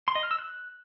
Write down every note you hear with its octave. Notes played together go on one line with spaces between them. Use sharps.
C6
D#5
F6
E6
F#6